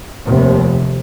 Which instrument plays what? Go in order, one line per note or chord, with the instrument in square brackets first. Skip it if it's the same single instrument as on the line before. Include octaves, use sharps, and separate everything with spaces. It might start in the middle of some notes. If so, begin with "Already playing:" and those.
[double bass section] F1 D#2 C3